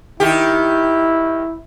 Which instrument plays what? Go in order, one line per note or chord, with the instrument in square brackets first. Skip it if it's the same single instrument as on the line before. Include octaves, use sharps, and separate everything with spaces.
[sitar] D#3 G4 [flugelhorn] E4